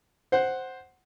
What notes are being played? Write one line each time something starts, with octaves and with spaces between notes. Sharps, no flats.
C5 F#5